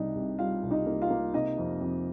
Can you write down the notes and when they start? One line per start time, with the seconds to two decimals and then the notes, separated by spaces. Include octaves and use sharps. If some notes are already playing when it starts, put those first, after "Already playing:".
Already playing: C2 C3 G3 D4 D#4 D#5
0.15 C2
0.39 G3 F4 F5
0.63 C2
0.71 D#4 D#5
0.86 A#3
1.02 F4 F5
1.10 A#3
1.33 C3 D#4 D#5
1.58 F2
1.80 F2